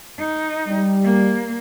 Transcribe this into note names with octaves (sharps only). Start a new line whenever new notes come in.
D#4
G3
A#3